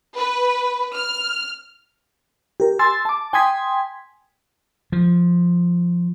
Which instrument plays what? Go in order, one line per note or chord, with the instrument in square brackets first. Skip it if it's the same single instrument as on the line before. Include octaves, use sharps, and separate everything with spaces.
[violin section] B4
F6
[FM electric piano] G4 A#4
G#5 C6 E6 A6
A5 D6
G5 G#5 C6 D#6 G#6 B6
[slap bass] F3